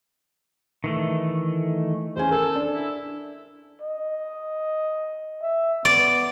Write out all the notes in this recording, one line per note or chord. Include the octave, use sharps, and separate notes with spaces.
D#3 E3 A3
E2 C#4 C5 G#5
A4 A#4 G#5
D4
E4
D#5
E5
B3 D5